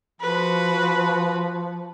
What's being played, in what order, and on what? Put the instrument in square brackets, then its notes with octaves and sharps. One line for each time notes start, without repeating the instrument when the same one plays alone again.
[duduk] F3 [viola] F#4 B4